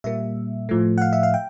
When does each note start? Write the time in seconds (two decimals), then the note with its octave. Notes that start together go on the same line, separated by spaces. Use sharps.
0.04 A#2 G3 A#3 E5
0.69 A2 F3 A3
0.98 F#5
1.02 F5
1.13 E5
1.23 F5
1.34 G5